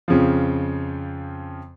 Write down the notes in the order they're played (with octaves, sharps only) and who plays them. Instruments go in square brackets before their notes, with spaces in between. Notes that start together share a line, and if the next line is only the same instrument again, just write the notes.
[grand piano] F2 C#3 F3